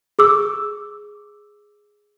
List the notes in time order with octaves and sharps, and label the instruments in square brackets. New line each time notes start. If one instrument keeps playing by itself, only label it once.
[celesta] G#4 D6 E6